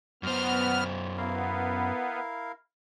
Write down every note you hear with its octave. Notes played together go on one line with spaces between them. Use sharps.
F#2 B3 C5 F6
B3 E4 A#4 F5